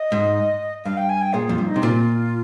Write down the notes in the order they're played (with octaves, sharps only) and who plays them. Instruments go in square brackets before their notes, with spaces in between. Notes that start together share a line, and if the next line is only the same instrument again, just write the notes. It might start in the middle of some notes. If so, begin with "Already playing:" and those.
Already playing: [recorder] D#5
[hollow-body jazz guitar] G#2
[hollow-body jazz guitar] G2 [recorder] F5
[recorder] G5
G#5
G5
[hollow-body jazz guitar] A#2 [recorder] G#4
[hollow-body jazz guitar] F2 [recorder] F4
[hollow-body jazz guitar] G2
[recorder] D#4
[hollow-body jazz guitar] C3
[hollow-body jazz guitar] A#2 [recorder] F4